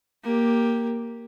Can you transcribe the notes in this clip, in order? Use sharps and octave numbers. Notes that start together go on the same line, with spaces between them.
A#3 G4